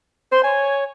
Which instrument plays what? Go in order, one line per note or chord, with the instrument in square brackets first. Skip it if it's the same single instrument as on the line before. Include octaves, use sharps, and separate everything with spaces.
[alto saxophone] C5 [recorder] C6
[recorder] C#5 [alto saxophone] G#5